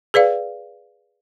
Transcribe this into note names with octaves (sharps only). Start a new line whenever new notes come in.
G#4 B4 D5 F5